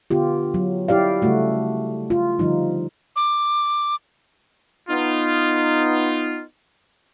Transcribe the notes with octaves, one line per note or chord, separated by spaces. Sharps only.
D3 B3 F4 G4
F#3
E4 G4 D5 F5
C#3 G3 A3 F#4
F4
D3 F3 G3 D#4
D6
B3 D#4 F4